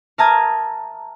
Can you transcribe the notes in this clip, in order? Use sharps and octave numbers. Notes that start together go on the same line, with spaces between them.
A#4 E5 A5 A#5 D#6 G#6